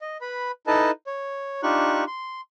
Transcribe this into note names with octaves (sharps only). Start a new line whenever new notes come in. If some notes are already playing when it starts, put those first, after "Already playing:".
D#5
B4 B5
D#4 E4 A4 B4 D#5 A5
C#5
D4 D#4 F4 G4 C#6 F#6
C6